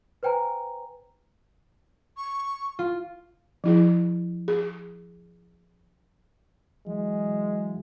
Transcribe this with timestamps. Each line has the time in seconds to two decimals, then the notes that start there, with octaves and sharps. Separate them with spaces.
0.23 B4 C5 G5 G#5 A#5
2.17 C#6
2.79 F4
3.64 F3 E4 G#4
4.48 G#4
6.87 E3 F#3 G#3